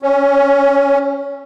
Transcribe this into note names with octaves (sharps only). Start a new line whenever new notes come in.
C#4